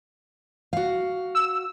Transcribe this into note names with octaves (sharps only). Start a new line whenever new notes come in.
F#4 F5
E6